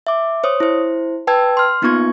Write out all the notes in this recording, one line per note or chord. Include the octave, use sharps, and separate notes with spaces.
E5 D6
C5 C#5 D#6
E4 C5
B4 G5 A5 E6 G#6
C6 F6
A#3 B3 D#4 F4 C#6 G#6